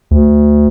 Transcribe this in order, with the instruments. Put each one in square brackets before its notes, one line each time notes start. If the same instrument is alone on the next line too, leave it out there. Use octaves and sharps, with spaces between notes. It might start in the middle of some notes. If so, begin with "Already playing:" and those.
[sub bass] D2